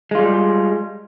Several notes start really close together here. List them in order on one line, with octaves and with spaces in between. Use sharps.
G#3 F4 G3